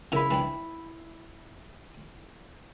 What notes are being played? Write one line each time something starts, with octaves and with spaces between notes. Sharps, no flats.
C#3 E4 A#4 B5
E3 C4 D4